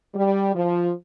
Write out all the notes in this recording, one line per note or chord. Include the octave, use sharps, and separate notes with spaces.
G3
F3